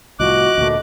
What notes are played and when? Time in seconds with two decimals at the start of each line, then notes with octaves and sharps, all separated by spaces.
0.20 C2 A2 F3 F#4 D#5 D6 F#6
0.58 D2 A#2 A3